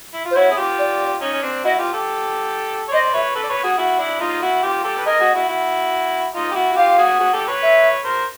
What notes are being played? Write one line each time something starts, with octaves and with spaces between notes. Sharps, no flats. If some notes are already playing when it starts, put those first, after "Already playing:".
E4
F4
C5
E4 F#4 C#5
G#4
F4 G4
D5
C#4 D#4
C#4
C4 D4
E4 F#4 D#5
F4 G4
G4 A4
C#5
C5 D5 D#5
B4 C#5 E5
A4 B4
D5
B4 C#5
F#4 G#4
E4 F#4
D4 E4
D#4 F4
E4 F#4
F4 G4
G4 A4
B4
G#4 A#4 D#5
F#4 G#4
E4 F#4
E4 F#4
D#4 F4
G4
E4 F#4
F#4
F4 G4 F5
F#4 G#4
F#4 G#4
G4 A4
B4 C#5
E5
A#4 C5